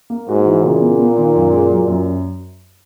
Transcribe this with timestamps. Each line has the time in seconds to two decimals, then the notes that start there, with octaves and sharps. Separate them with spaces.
0.10 A#3
0.29 G#2 F#4
0.46 E3
0.63 A#2 C#3
0.81 B3
0.99 B3
1.17 D#3
1.35 F#2
1.52 G#3
1.70 F#3
1.88 F#2